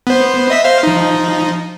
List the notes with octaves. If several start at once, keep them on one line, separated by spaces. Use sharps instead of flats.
B3 C5
D#5 E5 B6
C5 F5
F3 D#4